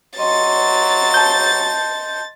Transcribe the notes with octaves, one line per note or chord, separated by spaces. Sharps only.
F#3 D#5 C6 A6
A5 G6